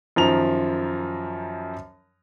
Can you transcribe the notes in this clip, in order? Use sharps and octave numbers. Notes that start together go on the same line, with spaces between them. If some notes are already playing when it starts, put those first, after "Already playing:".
F#2 D#3 F3 A#5 F7